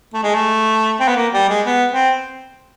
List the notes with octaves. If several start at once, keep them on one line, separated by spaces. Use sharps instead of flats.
A3
G#3
A3
C4
B3
A#3
G3
G#3
B3
C4